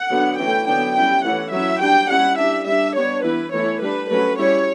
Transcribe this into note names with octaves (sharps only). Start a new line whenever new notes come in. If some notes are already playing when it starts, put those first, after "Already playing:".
Already playing: F#5
D3 F#3 B3 D4
E3 A3 C#4 G5
D3 F#3 B3 D4 G5
G3 C#4 E4 G5
E3 A3 C#4 E4 F#5
F#3 C#4 E4 E5
G3 D4 G5
G3 C#4 E4 F#5
D4 E5
G3
G3 D4 E5
G3 B3 D4 C#5
E3 B3 E4 B4
E3 A3 E4 C#5
G3 D4 B4
F#3 A3 C#4 B4
G3 C#4 E4 C#5